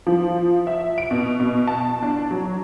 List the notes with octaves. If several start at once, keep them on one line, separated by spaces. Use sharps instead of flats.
F3
E5
D7
B2
B2
A5
D4
F#3